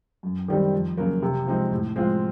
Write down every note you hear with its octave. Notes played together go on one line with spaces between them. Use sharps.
F#2
D#3 G3 C4 D#4
F2
C#3 F#3 A#3
C3
F3 G#3 C4 D#4
A2
F3 G#3 C4 F4